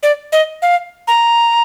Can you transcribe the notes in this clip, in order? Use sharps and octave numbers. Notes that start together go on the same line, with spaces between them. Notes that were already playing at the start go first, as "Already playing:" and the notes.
D5
D#5
F5
A#5